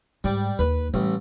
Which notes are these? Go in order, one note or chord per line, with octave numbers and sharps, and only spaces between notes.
G#2 G3 D6
D#2 B4
A1 E3 G3